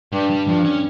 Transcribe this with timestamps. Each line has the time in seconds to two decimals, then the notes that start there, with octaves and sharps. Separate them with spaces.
0.13 G2 G3
0.30 G3
0.47 G2 F3
0.65 C#4